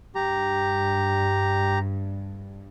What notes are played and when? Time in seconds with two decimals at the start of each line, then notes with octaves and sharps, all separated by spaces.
0.15 G2 G4 A#5